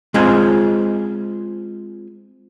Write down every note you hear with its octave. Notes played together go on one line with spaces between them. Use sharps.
G#3 C4 F4 G#4 C5 G#5